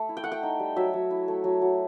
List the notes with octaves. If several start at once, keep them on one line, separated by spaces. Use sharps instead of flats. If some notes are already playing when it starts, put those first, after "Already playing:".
Already playing: A3
E4
G5
A3 F#5
G5
D#4
G3
F#3 E5
F#3
E4
A3
F#3
F#3